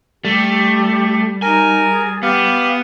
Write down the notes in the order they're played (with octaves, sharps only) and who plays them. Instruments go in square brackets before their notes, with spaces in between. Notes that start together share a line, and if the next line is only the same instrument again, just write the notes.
[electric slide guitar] G3 [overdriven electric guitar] A3 [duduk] G4
[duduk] D#4 [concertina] A#4 [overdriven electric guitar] G#5
[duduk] G#4
[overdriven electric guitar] B3 [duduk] G4 [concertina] F5